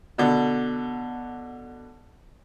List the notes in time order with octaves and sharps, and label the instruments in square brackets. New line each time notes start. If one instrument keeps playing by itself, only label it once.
[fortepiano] B2 D3